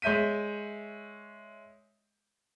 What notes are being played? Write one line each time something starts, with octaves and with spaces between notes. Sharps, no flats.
G#3 C#5 E5 G6 B6 D#7